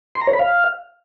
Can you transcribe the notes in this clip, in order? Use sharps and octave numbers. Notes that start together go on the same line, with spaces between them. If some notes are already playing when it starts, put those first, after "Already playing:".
C6
A#5
C#5
B5
F5